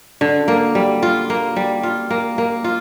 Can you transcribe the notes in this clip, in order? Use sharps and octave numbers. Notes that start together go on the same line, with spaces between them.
D3
A#3
G3
F4
A#3
G3
F4
A#3
A#3
F4